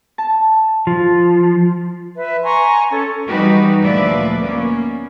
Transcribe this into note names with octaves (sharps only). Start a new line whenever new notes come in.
A5
F3
B4 E5
G#5 A#5 C6 C#6
C#4 A4
E3 G3 D#4 F#4 G4 B4
D2 A#2 F3 B4 D5 E5
A#3 B3 C#4